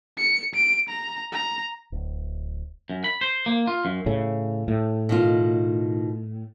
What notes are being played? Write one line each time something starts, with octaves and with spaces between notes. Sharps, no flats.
C#7
D7
A#5
A#5
D1
F#2
B5
C5
A#3
F4
F#2
A2 C#3
A2
B2 D#3 F4